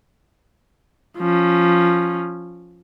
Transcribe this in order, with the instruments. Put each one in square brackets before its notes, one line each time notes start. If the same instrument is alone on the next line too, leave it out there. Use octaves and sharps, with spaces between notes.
[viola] F3 C#4